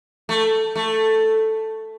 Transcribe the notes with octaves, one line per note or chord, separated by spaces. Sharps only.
A3
A3